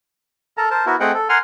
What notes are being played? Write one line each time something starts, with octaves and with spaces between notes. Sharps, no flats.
A4 A#4 A5 A#5
A#4 C5 A5
B3 E4 F#4 A#4
A3 C4 G#4 D#5 F#5 G5
A4
A#4 F#5 G#5 C6 F6